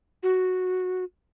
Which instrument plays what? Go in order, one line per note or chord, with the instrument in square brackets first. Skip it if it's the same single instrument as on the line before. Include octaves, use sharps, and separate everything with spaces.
[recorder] F#4